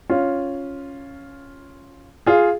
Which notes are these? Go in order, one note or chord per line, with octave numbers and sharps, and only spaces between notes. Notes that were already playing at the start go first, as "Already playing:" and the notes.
C#4 F4
F4 G#4